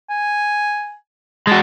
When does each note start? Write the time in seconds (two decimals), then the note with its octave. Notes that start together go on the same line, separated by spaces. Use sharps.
0.09 G#5
1.47 G#3 F#4 A5